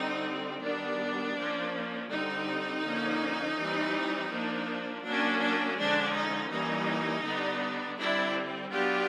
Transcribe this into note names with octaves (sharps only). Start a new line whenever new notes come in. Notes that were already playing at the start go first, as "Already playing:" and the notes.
Already playing: D3 G3 C4 D#4
D#3 G3 B3 D4
F3 A#3 C#4
D3 G3 C4 D#4
D3 F3 A#3 C#4
E3 G3 C4
F3 A#3 D4
F#3 A#3 C#4 D4
D4
D3 F3 G#3 C#4 D4
D#4
E3 G3 A#3 C#4 D#4
D3 G3 B3 D4
D3 G3 C4 D4 E4
F#3 B3 D4 F4 G4